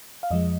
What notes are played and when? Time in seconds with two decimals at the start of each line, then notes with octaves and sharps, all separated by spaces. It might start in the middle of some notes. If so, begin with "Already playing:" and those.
0.23 F5
0.31 F2 F3 G#3 D#5